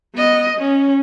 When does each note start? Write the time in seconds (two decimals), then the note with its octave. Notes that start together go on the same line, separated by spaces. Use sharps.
0.15 B3 D#5
0.57 C#4